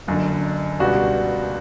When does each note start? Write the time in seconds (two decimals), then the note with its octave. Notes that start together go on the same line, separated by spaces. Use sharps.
0.07 F#1 F#2 D3
0.79 C#2 B2 G3 D4 F#4